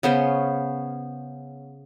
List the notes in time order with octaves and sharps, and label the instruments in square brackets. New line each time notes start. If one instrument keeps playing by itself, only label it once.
[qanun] C#3 B3 C#4 C5